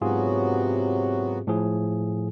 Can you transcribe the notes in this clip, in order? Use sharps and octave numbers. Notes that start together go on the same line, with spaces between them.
G#2 C3 F#3 B3 F4 F#4 G#4
A2 F3 G#4